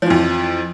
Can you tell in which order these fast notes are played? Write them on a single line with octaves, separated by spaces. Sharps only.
F3 E3 F2